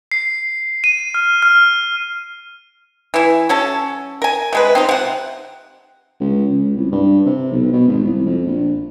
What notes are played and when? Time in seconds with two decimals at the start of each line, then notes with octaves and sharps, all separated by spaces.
0.12 C7
0.84 D#7
1.14 F6
1.42 F6
3.14 E3 E4
3.49 F#3 C#4 F#4 A4
4.22 A#4 G#5
4.53 C3 G#3 B4
4.75 C4 D#4 F4
4.89 C3 F#5
6.20 C#2
6.51 C#2
6.76 C2
6.92 G2
7.26 C3
7.52 B1
7.73 B2
7.88 G#1
8.04 C2
8.26 F2
8.47 A#1